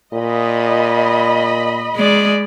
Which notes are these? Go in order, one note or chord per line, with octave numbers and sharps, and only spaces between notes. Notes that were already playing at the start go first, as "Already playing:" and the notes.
A#2 D#5 B5
G#3 D5